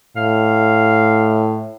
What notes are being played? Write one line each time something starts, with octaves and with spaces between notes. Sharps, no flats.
A2 F5